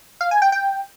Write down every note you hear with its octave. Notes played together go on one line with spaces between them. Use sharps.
F5
G#5
G5
G5